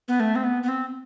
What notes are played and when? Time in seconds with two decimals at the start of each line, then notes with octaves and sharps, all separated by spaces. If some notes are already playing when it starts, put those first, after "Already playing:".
0.08 B3
0.20 A3
0.36 C4
0.44 B3
0.63 B3
0.68 C4